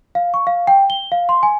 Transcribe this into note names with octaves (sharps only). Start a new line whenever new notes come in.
F5
C#6
F5
G5
G7
F5
C6
G#5